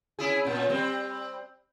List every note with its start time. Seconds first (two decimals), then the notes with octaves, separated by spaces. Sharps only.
0.19 C#4 E4 G#4
0.45 A#2 C#4
0.69 G3 C4